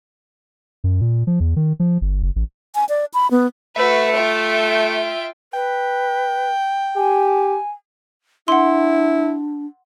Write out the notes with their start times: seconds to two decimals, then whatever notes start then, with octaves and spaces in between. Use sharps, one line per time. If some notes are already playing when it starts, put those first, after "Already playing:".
0.84 F#2
1.01 A#2
1.27 F3
1.40 E2
1.56 D#3
1.80 F3
2.01 G1
2.22 F#1
2.36 A1
2.75 G#5
2.89 D5
3.14 B5
3.31 B3
3.76 A3 F#4 B4 E5
4.16 F4 G5
5.53 B4 G5
6.96 G4 G#5
8.48 D4 E4 F#5 C6